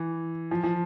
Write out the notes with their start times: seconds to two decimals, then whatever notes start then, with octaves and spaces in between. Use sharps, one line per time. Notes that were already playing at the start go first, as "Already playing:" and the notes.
Already playing: E3
0.51 F3
0.64 F3